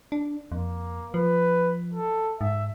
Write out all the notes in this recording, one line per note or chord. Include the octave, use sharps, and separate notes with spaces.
D4
F2 A#3
F3 B4
A4
G#2 E5